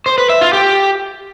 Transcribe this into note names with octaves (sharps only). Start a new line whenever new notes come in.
C5
B4
E5
F4
G4